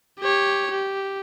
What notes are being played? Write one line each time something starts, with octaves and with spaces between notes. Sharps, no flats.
G4 C#5
G4